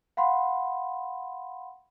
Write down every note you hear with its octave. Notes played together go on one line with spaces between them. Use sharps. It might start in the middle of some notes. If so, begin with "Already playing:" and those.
F5 F#5 B5 C6